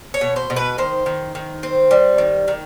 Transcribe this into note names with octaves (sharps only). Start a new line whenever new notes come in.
C#5
B2
C5
B2
B4
D#3 C5
D#3
D#3
C4
G3
D#3
D#3